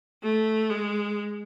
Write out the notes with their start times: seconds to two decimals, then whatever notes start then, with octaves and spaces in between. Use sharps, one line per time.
0.23 A3
0.70 G#3